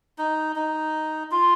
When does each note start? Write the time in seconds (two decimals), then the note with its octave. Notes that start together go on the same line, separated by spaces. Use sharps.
0.18 D#4
0.56 D#4
1.31 F4